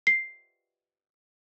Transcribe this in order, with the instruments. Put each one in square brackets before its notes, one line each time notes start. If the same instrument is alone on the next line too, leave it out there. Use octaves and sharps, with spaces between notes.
[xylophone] C7